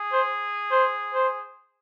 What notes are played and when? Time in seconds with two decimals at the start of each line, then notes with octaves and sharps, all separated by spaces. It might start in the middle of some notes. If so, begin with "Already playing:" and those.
Already playing: G#4
0.12 C5
0.71 C5
1.14 C5